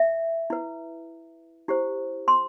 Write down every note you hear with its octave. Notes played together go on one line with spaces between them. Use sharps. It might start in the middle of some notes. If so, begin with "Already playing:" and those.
Already playing: E5
E4 B4
E4 G4 C5
C6